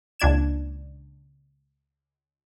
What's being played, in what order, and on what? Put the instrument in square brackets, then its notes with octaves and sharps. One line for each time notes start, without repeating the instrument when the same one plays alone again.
[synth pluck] C#2 A#2 D4 G#6 E7